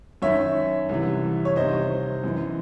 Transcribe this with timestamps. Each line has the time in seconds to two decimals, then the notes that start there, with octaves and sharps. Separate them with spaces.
0.22 F#2 D#3 C#5 E5
0.89 C2 C3 E3
1.45 C#5
1.56 C2 C3 D#3 C5 D#5
2.24 F#2 E3